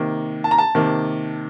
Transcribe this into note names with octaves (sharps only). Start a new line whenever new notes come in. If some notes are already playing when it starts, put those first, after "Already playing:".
Already playing: C3 D#3 A#3
A5
A#5
A5
C3 D#3 A#3